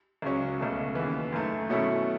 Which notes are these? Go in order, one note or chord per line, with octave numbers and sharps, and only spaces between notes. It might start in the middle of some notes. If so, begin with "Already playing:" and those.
C#2 C#3 F#3 C#4
C#2 B2 A3
D#2 C#3 E3
F#2 D#3 A3
B2 F#3 A3 C#4 E4